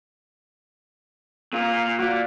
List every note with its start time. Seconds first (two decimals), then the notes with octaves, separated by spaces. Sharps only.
1.53 A#2 F4
1.99 F#4 D5